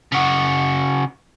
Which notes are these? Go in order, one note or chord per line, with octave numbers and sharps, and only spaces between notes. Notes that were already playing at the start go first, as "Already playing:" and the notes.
C#3 F#4